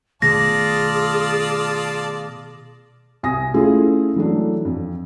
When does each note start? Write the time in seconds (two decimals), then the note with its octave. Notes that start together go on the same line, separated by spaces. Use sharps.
0.22 B2 D#3 A3 F4 G#4 D5 A5 A#6
3.23 C2 G#5 D#6 A#6
3.54 A3 C#4 E4 F4 G#4
4.16 E3 F#3 A3 D4
4.65 F2